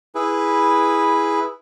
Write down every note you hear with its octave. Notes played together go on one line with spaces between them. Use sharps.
E4 G#4 B4